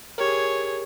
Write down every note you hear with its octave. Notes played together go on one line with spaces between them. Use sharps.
G4 G#4 A#4 C#5